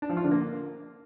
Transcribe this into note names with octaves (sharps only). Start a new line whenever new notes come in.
D4
F3
F4
D3
A#3